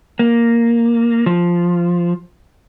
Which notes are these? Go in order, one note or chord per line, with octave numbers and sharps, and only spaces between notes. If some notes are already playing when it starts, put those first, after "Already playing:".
A#3
F3